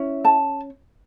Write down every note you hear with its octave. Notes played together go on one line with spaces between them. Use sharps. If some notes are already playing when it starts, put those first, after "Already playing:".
Already playing: C#4 E4
A5